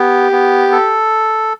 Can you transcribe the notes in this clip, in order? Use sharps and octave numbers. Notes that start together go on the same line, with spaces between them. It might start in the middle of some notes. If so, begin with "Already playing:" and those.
Already playing: B3 G4
B3
A4